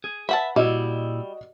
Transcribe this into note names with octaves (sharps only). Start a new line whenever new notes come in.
G#4
B4 E5 F#5 A5
A#2 G3 E4 F#4 D#5